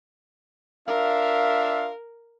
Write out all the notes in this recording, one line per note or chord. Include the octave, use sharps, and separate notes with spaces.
D4 F4 A#4 E5 F5